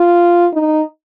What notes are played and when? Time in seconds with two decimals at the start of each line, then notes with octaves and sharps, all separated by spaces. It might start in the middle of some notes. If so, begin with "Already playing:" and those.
Already playing: F4
0.54 D#4